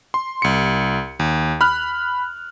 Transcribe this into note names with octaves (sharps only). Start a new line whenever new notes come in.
C6
C2 C#7
D#2
B5 F6 F#6